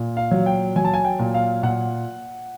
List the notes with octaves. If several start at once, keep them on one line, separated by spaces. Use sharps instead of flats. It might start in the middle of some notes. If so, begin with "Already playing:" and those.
Already playing: A#2
F5
F#3
G5
F#3 G#5
A5
G#5
G5
A#2
F5
A#2 F#5